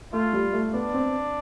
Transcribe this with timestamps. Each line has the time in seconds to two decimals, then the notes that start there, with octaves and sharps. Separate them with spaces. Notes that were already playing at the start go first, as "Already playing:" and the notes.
0.13 A3 F4
0.33 G3
0.53 A3
0.74 B3 D4
0.94 C4